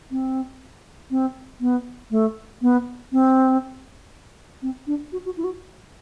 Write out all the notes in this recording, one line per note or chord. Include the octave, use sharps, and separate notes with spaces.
C4
C4
B3
A3
B3
C4
C4
D4
F#4
F#4
E4
F#4